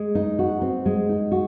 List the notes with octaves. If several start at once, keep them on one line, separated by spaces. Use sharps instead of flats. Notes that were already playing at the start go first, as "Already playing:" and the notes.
Already playing: G#3
D#4
F#4
C4
G#3
D#4
F#4